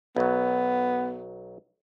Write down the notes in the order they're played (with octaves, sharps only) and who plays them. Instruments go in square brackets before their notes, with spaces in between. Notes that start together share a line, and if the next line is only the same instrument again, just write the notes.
[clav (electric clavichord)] B1 F#3 [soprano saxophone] B3